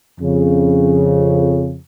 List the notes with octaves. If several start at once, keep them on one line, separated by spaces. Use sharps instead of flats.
F2 C#3